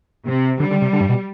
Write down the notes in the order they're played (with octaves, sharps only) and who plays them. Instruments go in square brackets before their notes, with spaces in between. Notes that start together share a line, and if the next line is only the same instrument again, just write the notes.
[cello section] C3
[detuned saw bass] D3 [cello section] G3
[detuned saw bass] D3
C3
D3
G2
B2